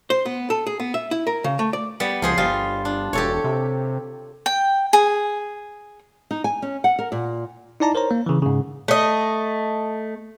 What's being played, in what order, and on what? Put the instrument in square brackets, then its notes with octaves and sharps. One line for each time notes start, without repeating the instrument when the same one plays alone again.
[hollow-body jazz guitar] C5
B3
A4
G#4
B3
E5
E4
A#4
C#3
A3
D5
[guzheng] G3 B3 D5
[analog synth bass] C#2 [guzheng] F3 G#4 C5
[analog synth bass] G1 [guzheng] G3 F4 D#5
[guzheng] D4
[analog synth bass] E1 [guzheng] G4 A4 C#5
[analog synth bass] C3
[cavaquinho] G5
G#4
[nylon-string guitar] D#4
G#5
C#4
F#5
A#4
A#2
[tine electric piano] D#4 E4 D5 A5 A#5
A#4 C5 C#5 A#5
A#3
C#3 E3
G#2 C#3
[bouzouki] A3 D#5